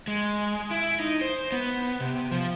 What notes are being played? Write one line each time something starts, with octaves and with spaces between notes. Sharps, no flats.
G#3
E4
D#4
C5
B3
C3
F3